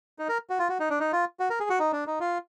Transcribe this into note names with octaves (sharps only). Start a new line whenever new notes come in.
D#4
A#4
F#4
F4
F#4
D#4
D4
D#4
F4
F#4
A#4
G#4
F#4
D#4
D4
D#4
F4